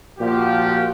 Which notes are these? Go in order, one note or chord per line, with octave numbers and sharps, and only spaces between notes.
A#2 F3 F#4 G4